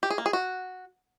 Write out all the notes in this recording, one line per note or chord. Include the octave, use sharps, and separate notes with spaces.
G4
G#4
A#3
G#4
F#4